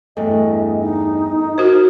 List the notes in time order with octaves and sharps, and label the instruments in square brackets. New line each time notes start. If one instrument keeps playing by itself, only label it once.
[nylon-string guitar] E2 G2 A3 [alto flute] D#5
[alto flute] D#4
[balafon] F#4 C5 [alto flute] A#4